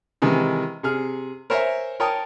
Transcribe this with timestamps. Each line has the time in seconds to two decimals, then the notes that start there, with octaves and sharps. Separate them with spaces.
0.22 C3 D#3 E3 G#3
0.83 C3 G#4 F6
1.50 A#4 C5 C#5 E5 G#5 A#5
2.00 A#4 C#5 G5 A5 D#6